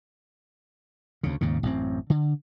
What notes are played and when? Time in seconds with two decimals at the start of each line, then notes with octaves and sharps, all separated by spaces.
1.23 D2 C#3
1.41 D#2 G#2 C#3
1.63 A1 F#2 C4
2.10 D3